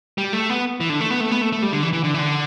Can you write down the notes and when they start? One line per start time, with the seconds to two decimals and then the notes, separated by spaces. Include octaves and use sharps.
0.18 G3
0.33 A3
0.50 B3
0.80 E3
0.90 D3
1.00 A3
1.10 B3
1.20 A3
1.31 B3
1.42 A3
1.52 A3
1.62 G3
1.73 D3
1.83 E3
1.93 E3
2.04 D3
2.14 E3
2.19 D3